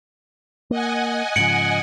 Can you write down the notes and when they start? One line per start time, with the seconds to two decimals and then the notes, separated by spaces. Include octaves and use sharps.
0.71 A#3 D#5 F#5 G#5
1.36 G#2 C#3 F3 C#7 D7 F#7